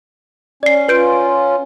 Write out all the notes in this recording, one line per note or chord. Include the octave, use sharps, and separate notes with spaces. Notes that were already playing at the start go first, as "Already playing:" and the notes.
C#4 D5 C7
C#4 F4 B4 G6 D7